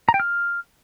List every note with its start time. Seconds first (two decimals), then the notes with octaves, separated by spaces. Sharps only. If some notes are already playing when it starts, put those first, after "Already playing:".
0.09 A#5
0.14 G5
0.20 F6